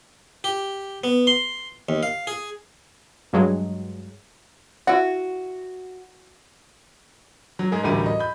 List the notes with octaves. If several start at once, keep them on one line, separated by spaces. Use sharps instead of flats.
G4
B3
C6
D#2
F5
G#4
G2 F#3 G#3
E4 F#4 F#5
F#3
G#2 G#4 A#4
A1 D2 A2 G3 A#4 D#7
D#5
B5 G6